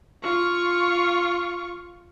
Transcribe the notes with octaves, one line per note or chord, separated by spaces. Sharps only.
F4 C#6